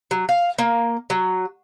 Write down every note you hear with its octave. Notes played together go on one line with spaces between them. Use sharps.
F#3
F5
A#3
F#3